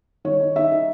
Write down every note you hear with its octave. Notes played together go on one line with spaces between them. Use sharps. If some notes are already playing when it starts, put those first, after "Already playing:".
D#3 C#5
D#4
D#4 E5
D#4